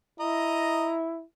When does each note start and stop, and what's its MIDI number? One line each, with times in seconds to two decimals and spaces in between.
0.20 1.23 64
0.20 0.94 75
0.20 0.94 82